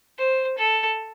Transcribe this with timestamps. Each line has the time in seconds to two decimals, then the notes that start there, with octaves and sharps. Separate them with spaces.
0.18 C5
0.58 A4